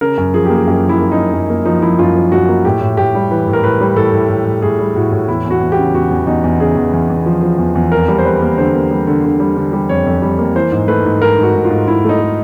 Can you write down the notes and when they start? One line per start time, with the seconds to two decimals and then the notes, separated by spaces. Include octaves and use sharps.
0.01 C#3 A#4
0.18 F#2
0.34 F3 G#4
0.46 A#3 G4
0.56 G#4
0.67 F#2 G4
0.84 F3
0.89 E4
1.01 A#3
1.12 D#4
1.17 F#2
1.33 F#2
1.50 A#3
1.65 F3 D#4
1.82 F3 E4
1.99 F#2 F4
2.16 F3
2.32 F#2 F#4
2.49 A#3
2.65 A2 G4
2.81 A2
2.97 A2 G4
3.15 G3
3.30 E3 B4
3.47 A2
3.53 A#4
3.63 A2 B4
3.81 G3
3.96 A2 A4
4.13 A2
4.30 A2
4.46 A2
4.62 A2 G#4
4.79 G3
4.96 A2 F#4
5.12 A2
5.28 E2 E4
5.45 E2
5.50 F#4
5.61 E2
5.72 G4
5.78 C#3
5.94 E2 F#4
6.11 E2
6.27 E2 D#4
6.44 E2
6.60 C#3 G#4
6.77 E2
6.93 E2
7.10 E2
7.26 F3
7.43 F3
7.58 E2
7.75 E2
7.92 F2 A#4
8.08 G3
8.18 C5
8.25 G3 B4
8.41 A#3
8.58 D3 C5
8.75 A#3
8.91 G3
9.07 D3
9.24 D3
9.40 G3
9.57 D3
9.73 G3
9.89 F2 C#5
10.06 F2
10.22 G3
10.39 A#3
10.55 E3 C5
10.72 G#2
10.88 A3 B4
11.05 G#2
11.22 G#2 A#4
11.38 G#2 F#4
11.55 G#2
11.65 F4
11.70 G#2
11.87 G#2 E4
12.04 A3 D#4
12.20 A3